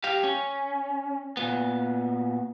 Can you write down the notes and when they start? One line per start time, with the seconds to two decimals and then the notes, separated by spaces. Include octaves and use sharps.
0.04 G4 F5
0.24 C#4
1.37 A#2 B3